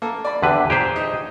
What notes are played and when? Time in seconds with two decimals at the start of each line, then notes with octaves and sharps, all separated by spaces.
0.02 A#3 A4
0.25 D5 B5
0.42 E2 D3 G4 B4 F#5
0.70 A#2 G4 G#4 C5
0.96 D#4